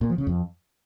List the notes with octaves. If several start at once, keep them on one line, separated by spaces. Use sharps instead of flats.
A#2
F3
C#3
F2